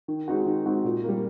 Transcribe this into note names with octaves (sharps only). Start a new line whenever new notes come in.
D#3
G#3 C4 D#4 F#4
D#3
G#3 C4 D#4 F#4
A#2
G3 A#3